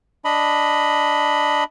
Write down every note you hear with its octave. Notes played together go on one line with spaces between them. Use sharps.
D4 D#5 B5